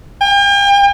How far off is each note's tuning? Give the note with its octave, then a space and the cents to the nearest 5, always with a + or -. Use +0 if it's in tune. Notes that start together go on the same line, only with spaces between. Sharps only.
G5 +40